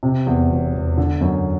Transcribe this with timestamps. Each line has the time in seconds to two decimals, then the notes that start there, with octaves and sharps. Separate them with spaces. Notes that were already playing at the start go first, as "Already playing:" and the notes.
0.03 C3
0.26 E2
0.51 E1
0.74 E1
0.97 D3
1.21 F#2